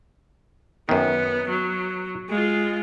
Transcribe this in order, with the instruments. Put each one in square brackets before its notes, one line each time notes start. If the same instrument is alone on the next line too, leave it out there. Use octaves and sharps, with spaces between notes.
[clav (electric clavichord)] F#2 D#3 [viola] B3
[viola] F#3
G#3 F4